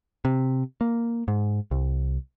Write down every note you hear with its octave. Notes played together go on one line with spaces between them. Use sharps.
C3
A#3
G#2
C2